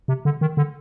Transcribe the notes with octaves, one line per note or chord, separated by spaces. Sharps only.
C3
D3
D#3
D3